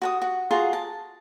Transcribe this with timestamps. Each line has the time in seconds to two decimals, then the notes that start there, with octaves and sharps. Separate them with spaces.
0.02 F#4 A5 D#6
0.22 F#4
0.51 F4 F#4 G#4 A#5
0.73 A5